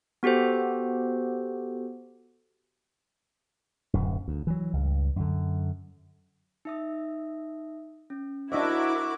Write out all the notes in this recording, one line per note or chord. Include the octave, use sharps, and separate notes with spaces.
B3 F#4 G4 A4 C5
D1 F#2
D2
E3 F#3
C#2 G2
F#2 D3
D#4 E5 D#6
C#4
D4 E4 F#4 A#4 C5 D#5 E5 D6